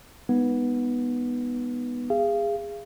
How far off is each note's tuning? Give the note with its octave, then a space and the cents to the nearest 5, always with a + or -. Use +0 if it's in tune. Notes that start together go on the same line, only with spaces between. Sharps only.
G#3 -30 B3 -10 D#4 -15
G#4 -20 F5 -35